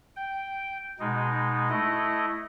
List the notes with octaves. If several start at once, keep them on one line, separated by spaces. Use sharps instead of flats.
G5
B2 G#3 D#4
A3 E4 D#5